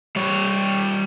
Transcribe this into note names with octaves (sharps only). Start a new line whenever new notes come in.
G3 C#5